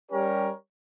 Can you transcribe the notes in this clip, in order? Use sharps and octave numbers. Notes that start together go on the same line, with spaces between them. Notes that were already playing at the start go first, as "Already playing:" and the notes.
G3 C#4 G4 A#4 C#5